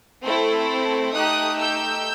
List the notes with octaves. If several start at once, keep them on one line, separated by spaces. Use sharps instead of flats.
A3 C4 E4 A4
A3 D#4 G4 D#6 F#6
E6 G6